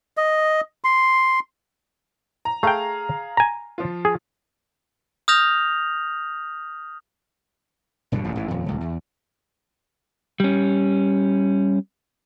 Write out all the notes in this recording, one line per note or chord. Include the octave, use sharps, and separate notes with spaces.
D#5
C6
A#5
A3 G#4 F5 G5 A#5
G#5 A#5
F3 F4
G#4
D#6 F6 G6 A#6 F7
E1 G2 B2 D3
D#1 A1 F#2 A2
A1 G#2 E3
D#1 F2
D#1 C#2
E2
G3 C#4